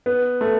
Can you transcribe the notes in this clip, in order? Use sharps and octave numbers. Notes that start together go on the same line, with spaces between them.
B3
A3